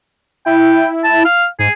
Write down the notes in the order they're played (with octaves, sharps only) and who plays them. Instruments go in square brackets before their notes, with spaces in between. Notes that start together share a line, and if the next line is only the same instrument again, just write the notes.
[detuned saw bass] E4 [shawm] G5
[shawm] A5
F5
[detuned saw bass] G#2 [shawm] G#4